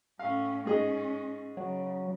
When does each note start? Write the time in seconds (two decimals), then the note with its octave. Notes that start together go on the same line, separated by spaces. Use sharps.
0.19 A2 C#4 F5
0.65 G#2 C#4 G#4 D#5
1.57 C#3 F#3